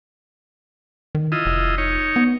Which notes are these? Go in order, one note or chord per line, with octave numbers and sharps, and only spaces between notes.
D#3
E4 F4 D#5
F1
D#4 C#5
B3